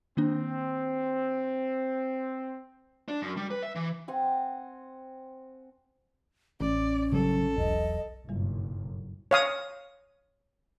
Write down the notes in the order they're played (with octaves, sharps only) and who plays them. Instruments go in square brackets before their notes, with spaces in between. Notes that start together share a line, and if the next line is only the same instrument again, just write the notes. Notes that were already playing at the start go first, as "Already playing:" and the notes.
[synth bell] D#3 A#3 D4 [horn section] C4
[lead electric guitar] D4
F#2
G3
B4
E5
E3
[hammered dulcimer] C4 F#5 G#5
[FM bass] A1 [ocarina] C#4 [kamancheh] D5
[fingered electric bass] C#3 F#3 G3 [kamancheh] A4
[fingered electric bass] E1 B1 [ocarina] D#5
[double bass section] F#1 B1 A#2 [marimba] G2 G3
[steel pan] C#5 F5 D#6